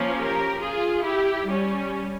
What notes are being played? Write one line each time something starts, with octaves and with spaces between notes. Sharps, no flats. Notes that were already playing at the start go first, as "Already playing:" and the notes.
Already playing: F3 A#3 C#4
G4 A#4
F4 G#4
E4 G4
G3 C#4